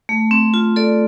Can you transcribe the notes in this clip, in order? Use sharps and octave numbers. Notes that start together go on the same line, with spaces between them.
A3
C4
F4
A4 D5